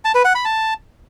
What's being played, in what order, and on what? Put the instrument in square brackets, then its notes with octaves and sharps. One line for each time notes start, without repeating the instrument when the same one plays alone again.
[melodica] A5
B4
F#5
B5
A5